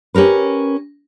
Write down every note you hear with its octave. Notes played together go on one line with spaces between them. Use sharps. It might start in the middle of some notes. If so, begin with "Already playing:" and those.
C#4 G4 A#4 B4